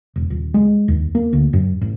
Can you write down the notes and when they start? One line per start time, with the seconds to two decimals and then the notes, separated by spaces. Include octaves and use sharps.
0.16 E1
0.30 D#1
0.54 G#3
0.88 D#2
1.15 A#3
1.33 D2
1.53 F#2
1.81 A1